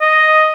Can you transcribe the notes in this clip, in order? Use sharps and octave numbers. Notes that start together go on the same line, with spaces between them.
D#5